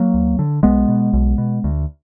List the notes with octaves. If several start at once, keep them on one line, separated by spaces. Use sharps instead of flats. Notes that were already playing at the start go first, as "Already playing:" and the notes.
Already playing: F#3 A#3
D2
D3
B1 G#3 B3
B2
B1
B2
D2